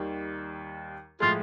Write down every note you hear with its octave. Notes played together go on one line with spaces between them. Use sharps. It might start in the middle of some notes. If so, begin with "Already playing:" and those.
Already playing: D#2 D#3 G3
A2 F3 G#3 F4